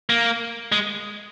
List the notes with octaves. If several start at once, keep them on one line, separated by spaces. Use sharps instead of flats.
A#3
G#3